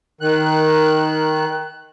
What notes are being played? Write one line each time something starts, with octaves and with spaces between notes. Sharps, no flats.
D#3 F#6